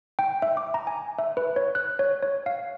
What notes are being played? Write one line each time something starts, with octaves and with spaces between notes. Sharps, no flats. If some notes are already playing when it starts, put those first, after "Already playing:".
G5
E5
D6
A#5
G#5
E5
B4
C#5
F#6
C#5
C#5
F5